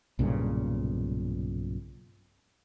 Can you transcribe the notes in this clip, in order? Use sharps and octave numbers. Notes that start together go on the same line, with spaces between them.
B1 G2 A#2 C#3